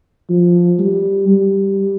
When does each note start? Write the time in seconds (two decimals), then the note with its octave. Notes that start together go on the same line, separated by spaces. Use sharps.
0.30 F3
0.79 G3
1.28 G3